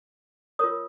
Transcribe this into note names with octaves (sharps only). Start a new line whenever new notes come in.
F4 A#4 C#5 D#6